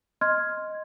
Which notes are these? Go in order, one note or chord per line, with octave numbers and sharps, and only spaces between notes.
D#5 C6 F6 G#6